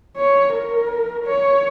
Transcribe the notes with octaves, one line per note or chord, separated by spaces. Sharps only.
C#5
A#4
C#5